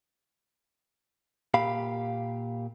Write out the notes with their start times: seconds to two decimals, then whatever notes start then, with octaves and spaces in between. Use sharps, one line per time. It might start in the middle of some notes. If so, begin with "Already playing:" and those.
1.54 A#2 G4 F5 B5